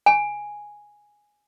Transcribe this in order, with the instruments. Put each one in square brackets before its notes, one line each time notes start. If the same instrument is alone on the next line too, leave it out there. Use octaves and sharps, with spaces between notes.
[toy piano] G#5